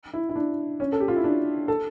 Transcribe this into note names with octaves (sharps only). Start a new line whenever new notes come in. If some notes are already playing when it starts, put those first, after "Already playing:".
E4
E4
D4
C#4
A4
G4
F4
E4
D4
A4